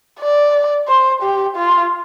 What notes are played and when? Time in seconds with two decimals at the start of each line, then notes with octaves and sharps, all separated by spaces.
0.20 D5
0.88 C5
1.22 G4
1.56 F4